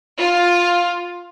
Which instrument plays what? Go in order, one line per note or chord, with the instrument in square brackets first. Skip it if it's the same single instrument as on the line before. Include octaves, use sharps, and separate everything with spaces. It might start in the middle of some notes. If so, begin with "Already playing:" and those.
[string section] F4